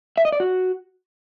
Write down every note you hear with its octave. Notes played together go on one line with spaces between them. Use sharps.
E5
D#5
D5
F#4